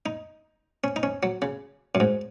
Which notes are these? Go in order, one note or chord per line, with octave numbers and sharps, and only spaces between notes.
D#4
C#4
D#4
C#4
F#3
C#3
F#2
G#2